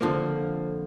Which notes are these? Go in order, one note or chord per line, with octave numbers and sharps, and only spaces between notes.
F2 D3 F3 A#3